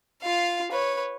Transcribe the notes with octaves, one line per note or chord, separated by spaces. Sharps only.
F4 F5
B4 C#5